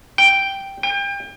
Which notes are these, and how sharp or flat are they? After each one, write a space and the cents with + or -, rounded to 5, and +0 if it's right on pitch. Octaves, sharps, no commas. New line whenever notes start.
G5 +0
G5 +35